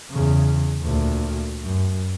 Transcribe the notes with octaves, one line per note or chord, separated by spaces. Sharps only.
E2 C#3
D2 A#2
F#2